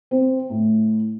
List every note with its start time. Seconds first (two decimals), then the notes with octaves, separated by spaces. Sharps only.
0.11 C4
0.50 A2